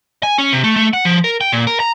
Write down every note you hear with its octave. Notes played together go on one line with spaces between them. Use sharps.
G#5
C#4
C3
A3
A3
F#5
F3
A#4
G5
A#2
A#4
A#5